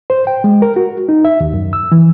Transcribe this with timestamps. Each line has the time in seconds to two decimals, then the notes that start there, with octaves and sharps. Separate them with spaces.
0.10 C5
0.27 G5
0.44 G#3
0.62 A#4
0.76 F#4
1.09 D#4
1.25 E5
1.40 D#2
1.54 F#2
1.73 E6
1.92 E3